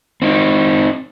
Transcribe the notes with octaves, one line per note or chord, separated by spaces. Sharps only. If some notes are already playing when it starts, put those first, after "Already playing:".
C4 D#4